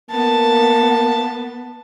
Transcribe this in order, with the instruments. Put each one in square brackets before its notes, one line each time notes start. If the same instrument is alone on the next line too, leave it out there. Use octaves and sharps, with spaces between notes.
[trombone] A#3 [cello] B3 [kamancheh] A5